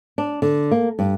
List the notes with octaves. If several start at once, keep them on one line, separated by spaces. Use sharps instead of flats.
D4
D3
A#3
G2